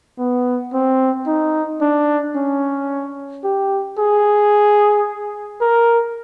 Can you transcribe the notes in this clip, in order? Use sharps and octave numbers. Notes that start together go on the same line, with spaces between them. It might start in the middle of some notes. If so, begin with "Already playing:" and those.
B3
C4
D#4
D4
C#4
G4
G#4
A#4